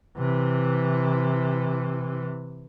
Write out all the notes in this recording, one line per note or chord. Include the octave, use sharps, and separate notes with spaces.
C3 E3